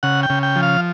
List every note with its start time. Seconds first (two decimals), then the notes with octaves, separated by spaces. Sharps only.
0.03 C#3 F#5
0.23 G5
0.30 C#3
0.43 G5
0.56 F3
0.63 F5